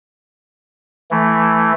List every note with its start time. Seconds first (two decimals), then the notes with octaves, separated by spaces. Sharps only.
1.11 E3 A3